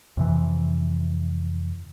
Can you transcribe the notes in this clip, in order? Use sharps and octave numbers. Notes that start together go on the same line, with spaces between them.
F2 C3 E3